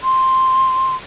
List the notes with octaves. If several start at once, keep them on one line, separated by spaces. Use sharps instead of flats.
C6